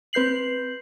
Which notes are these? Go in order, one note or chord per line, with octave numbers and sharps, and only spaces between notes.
C4 B4 G6 C7 F#7